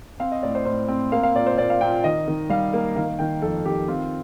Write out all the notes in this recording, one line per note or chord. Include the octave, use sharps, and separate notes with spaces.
C4 F5
D#5
A2 D5
C5
A2 C5
C4
A#3 F5
F5
A#2 D5
C5
A#2 D5
F5
A#2 G5
D#3 D#5
D#3
G3 F5
A#3
D#3 F5
D#3 G5
F2 A4
D#3 G4
C4 F4